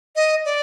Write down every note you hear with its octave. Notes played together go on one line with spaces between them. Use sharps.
D#5
D5